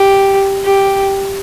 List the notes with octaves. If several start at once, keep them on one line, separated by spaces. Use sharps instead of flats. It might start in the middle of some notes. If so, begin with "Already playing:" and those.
Already playing: G4
G4